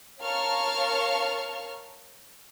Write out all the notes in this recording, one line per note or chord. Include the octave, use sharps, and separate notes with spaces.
A#4 C#5 F5 A5 C#6 F6